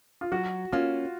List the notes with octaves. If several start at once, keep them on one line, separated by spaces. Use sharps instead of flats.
F4
F#3 F#4
A#3 C#4 F4